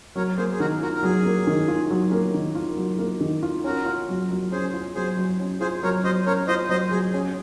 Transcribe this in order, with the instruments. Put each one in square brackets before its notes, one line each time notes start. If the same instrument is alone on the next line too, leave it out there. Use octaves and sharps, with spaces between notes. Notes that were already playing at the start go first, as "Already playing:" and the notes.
[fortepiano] F#3 [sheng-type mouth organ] A#4 C#5
[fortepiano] A#3 [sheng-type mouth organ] G#4 C5
[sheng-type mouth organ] G#4
[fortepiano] D#3 [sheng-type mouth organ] F#4 A#4
[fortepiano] F4 [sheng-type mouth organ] F#4 A#4
[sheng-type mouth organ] A#4
[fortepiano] F#3 [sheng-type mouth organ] G#4
[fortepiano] A#3
D#3
F4
F#3
A#3
D#3
F4
F#3
A#3
D#3
F4
[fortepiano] C#4 [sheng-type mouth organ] F#4 A#4
[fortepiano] F4
F#3
F#3
[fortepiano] C#4 [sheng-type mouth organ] G#4 C5
[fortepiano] F4
[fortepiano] F#3 [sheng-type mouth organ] G#4 C5
[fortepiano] F#3
C#4
[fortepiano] F4 [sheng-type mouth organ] G#4 C5
[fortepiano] F#3 [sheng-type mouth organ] A#4 C#5
[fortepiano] F#3 [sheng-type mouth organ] C5 D#5
[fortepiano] C#4 [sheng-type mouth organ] A#4 C#5
[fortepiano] F4 [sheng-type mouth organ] C5 D#5
[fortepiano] F#3 [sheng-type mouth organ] C5 D#5
[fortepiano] F#3 [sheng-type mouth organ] G#4
[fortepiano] C#4 [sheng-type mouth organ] G#4